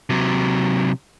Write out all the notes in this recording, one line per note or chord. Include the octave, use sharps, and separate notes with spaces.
C3 F#3